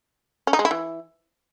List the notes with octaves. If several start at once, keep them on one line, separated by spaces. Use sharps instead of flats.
C#4
D#4
G#3
E4
E3